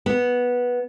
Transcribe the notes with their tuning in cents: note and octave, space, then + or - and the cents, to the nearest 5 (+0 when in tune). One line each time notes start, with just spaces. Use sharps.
B3 -10